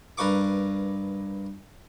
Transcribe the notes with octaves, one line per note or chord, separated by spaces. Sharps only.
G2 A#4 B4 F5 C#6 D6